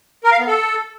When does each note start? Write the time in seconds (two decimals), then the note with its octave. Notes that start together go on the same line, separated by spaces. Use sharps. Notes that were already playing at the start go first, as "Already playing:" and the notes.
0.24 A#4
0.32 F5
0.39 B3
0.47 A4